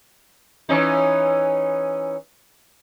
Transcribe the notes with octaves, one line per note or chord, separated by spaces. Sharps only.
E3 C#4 D#4